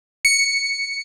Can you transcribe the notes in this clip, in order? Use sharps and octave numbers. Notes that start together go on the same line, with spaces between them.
C#7